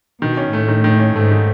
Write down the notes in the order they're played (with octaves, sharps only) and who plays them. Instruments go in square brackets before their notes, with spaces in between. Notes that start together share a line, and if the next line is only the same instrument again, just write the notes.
[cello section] B2 [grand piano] D#3
[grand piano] C#4
[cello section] A2 [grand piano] A3
[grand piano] D#3
D#3
C#4
[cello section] G#2 [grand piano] A3
[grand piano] D#3